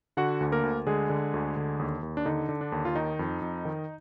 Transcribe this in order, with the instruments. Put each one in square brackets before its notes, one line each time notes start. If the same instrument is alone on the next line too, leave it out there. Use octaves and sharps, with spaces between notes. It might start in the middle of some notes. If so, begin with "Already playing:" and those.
[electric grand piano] D3 F#4 F#5
D2
A#3 A#4
D2
D3 G#3 G#4
D3
D2
D3
D#2
D#2
D4
D3 D#4
D3
D4
D#2
F4
D#3 D#4
F2
F2
D#3